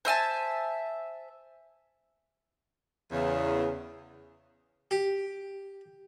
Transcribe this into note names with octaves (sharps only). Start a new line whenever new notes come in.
C5 E5 G#5 A5
E2 C#3
G4